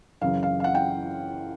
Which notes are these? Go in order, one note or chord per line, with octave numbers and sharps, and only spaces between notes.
F#2 C#3 E3 F5
F5
F5
F#5
G5